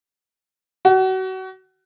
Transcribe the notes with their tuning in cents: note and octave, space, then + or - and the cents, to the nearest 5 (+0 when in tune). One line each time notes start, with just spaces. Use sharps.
F#4 +30